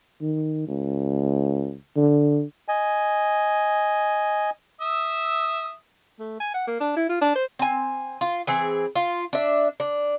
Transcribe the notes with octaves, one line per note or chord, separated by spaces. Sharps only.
D#3
C#2
D3
D#5 G#5
E5 D#6 E6
A3
G#5
F#5
A#3
D4
E4
F4
D4
C5
C4 G#5
F4
E3 C4 G#4
F4
D4 E5
D4